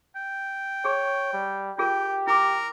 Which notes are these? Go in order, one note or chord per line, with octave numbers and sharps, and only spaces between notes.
G5
G#4 C#5
G3
F4 G4 G#4 A#4 G5
E4 A#4 D6